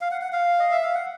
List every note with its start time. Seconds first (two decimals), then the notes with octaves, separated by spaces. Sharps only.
0.01 F5
0.11 F#5
0.21 F#5
0.33 F5
0.59 D#5
0.71 E5
0.82 F5
0.95 F#5